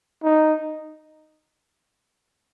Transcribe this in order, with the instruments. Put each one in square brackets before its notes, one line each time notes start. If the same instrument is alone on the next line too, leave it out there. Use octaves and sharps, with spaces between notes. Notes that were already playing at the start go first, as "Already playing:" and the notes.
[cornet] D#4